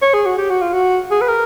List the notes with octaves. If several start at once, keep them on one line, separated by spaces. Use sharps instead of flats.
C#5
G#4
F#4
G4
F#4
F4
F#4
G#4
B4
A#4